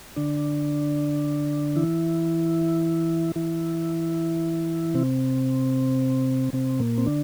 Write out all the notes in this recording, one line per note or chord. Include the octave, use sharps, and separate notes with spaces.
D3 D4
E3 E4
E3 E4
C3 C4
C3 C4
A#2 A#3
C4
D3 D4